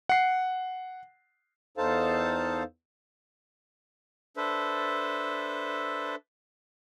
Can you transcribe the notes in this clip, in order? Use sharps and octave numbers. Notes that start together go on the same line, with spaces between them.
F#5 C7
E2 D#4 A4 C5 F5 A5
D4 A4 B4 C5 E5